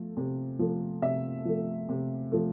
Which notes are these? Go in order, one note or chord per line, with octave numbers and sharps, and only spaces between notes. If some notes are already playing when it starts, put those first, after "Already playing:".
Already playing: F3 A3
C3
F3 A3
C3 E5
F3 A3
C3
F3 A3